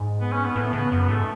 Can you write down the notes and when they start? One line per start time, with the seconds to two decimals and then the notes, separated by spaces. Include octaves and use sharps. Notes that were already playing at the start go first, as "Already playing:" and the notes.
Already playing: G#2
0.21 B3
0.32 C#4
0.44 B3
0.56 A2 B3
0.73 C#3 B3
0.91 F#2 B3
1.08 G#2 A3